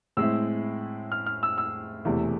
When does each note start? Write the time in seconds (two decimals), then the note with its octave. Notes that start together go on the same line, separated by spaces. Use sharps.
0.17 A2 G#3 C4 E4 E6
1.12 F6
1.26 F6
1.43 E6
1.58 E6
2.05 E1 E2 C3 E3 A3